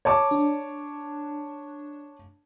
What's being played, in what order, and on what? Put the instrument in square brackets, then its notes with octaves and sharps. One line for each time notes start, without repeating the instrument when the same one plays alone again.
[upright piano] C#5 A5 D6
[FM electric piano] D4